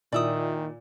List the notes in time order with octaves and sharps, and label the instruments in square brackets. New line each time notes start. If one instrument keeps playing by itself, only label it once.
[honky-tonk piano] A#2 E4 [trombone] D#3 [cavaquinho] D5 E5 D#6